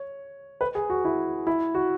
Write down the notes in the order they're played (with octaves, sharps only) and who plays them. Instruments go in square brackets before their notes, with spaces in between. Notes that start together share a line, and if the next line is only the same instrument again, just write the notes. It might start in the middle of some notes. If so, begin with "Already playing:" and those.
Already playing: [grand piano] C#5
B4
G#4
F#4
E4
E4
F#4